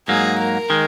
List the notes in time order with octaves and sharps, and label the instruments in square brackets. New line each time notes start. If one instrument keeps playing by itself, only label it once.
[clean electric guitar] G#2 F#3 A#3 [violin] G#4
[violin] A#4
[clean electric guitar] D#3 G#3